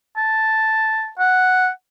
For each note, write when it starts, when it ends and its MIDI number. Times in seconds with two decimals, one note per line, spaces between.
0.17 1.09 81
1.19 1.68 78